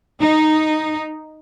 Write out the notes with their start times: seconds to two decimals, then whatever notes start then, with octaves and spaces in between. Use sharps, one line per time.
0.21 D#4